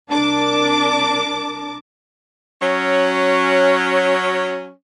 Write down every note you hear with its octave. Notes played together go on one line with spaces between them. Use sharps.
C2 D4 A#4 A5 D6
F#3 C#4